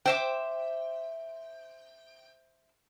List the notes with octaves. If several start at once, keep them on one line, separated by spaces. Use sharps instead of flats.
C5 E5 G5 D6